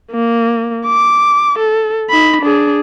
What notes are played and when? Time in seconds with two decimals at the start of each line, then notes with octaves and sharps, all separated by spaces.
0.12 A#3
0.86 D6
1.59 A4
2.10 D#4 B5
2.41 D4 G#4